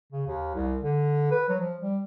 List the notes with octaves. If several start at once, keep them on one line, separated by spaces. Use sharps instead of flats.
C#3
D#2
C2
D3
B4
F#3
F3
G3